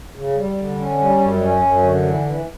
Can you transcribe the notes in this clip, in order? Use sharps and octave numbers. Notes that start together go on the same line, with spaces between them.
C#3
G3
D3
C#4
G3
F#2
C#4
F#2
D3
E3
E3